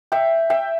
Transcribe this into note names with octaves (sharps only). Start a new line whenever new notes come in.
E5 G5
E5 G5